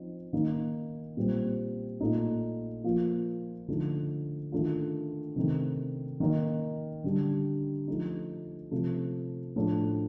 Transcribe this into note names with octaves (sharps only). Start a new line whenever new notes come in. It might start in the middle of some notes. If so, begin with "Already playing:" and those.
Already playing: F3 C4 D#4
D#3 A#3 D#4
A#2 G3 C4
A#2 A3 D#4
F3 A#3 F4
D3 F3 A3 D#4
D#3 A3 D4 F4
C3 D#3 A3
D#3 A#3 D#4
D3 G3 D4
F3 A3 D#4
C3 F3 A3
A2 F3 A3 D4